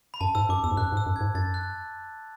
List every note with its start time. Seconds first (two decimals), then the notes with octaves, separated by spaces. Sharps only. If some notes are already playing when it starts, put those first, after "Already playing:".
0.14 B5
0.21 F#2 A5
0.35 G#2 E6
0.49 F#2 D6
0.64 E2 E6
0.71 G#2
0.77 F#2 F#6
0.92 G#2
0.97 E6
1.06 F#2
1.16 G#2 G#6
1.35 F#2 A6
1.54 F#6